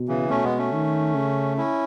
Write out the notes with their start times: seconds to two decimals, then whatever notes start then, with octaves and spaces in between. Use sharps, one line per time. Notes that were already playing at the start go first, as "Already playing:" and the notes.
Already playing: B2
0.08 C#3 E3
0.30 B2 A3 C#4
0.44 G#3 B3
0.58 A3 C#4
0.73 D#3
1.15 C#3
1.57 C#4 E4